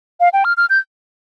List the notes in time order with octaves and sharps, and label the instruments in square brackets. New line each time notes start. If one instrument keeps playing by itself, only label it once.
[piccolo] F5
G5
F6
F6
G6